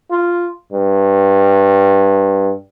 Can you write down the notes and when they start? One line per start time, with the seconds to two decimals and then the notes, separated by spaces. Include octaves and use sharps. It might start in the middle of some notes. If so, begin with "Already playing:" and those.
0.11 F4
0.72 G2